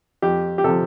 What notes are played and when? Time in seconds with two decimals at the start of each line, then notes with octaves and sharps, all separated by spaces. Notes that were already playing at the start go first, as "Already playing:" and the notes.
0.22 F2 G4
0.58 G4
0.64 C3 F3 A4